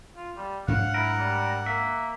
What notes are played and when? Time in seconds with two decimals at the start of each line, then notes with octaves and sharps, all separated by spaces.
0.16 F4
0.36 G3
0.68 G#2 F#3 D4 F5 F#5
0.94 E4 A#4
1.18 G3
1.66 A#3 E5